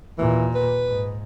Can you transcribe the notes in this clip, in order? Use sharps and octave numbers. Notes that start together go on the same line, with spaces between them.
D#2 A#2 E3
B4
G#2